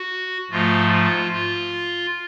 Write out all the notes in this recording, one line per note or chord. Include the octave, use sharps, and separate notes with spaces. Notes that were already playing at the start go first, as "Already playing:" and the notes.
Already playing: F#4
G#2 F3 A3 F4
F4
F4